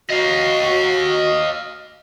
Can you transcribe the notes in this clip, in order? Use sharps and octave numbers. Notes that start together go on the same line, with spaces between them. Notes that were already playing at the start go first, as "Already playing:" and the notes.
F#4 D#5 F5